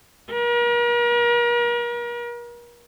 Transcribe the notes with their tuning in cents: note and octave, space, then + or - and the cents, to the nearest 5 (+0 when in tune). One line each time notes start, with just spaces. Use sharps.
A#4 +40